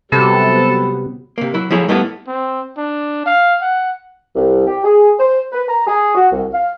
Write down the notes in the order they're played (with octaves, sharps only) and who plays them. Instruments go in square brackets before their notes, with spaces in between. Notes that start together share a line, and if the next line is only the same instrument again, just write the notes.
[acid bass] C3 [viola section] F#3 G3 B3 [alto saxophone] A4 [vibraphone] B5
[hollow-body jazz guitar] C3 A#3
F#3 E4
F3 F#3 A3 E4 G#4 C#5
G3 A3 B3 E4 A4 F5
[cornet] C4
D4
F5
F#5
[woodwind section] C2
G4
G#4
C5
B4
A#5
G#4
F#4
C2
F5